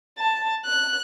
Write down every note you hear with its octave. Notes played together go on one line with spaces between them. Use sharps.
A5
F#6